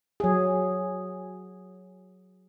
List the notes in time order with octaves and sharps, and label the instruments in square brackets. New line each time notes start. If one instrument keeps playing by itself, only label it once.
[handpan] F#3 G#4